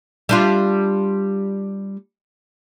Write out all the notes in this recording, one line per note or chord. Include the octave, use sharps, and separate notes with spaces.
G3 D4 F4